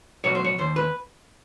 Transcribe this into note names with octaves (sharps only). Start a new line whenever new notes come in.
B2 F#3 C#5
C5
C#5
D#2 C5
B4